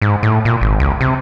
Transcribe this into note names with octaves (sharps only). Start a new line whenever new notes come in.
G#2
A2
A#2
G#1
C#2
C3